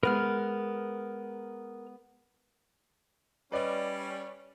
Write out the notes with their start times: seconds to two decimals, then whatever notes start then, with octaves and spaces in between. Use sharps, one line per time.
0.03 G#3 B3 A#4 B4 F6
3.52 G3 C#4 B4 D5 D#5